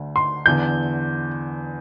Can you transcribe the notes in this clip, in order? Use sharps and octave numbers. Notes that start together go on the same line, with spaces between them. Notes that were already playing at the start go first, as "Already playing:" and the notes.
Already playing: D2 D3
C6
E2 D3 G6